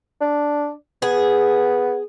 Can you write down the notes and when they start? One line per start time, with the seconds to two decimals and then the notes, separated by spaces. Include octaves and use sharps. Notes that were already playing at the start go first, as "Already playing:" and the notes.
0.21 D4
1.02 B3 G#4